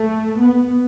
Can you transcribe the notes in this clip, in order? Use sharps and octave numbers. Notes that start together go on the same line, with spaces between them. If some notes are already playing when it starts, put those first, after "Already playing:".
Already playing: A3
B3